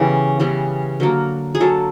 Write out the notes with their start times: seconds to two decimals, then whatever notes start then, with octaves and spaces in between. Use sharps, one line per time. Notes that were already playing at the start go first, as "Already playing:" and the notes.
Already playing: C#3 E3 G3 B3 G4
0.39 C#3 E3 G3 B3
1.00 D3 F#3 A#3
1.55 G#4
1.61 D3 F#3 A#3 A4